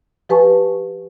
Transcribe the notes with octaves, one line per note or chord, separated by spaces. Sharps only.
F3 G4 B4 G#5 A5 C#6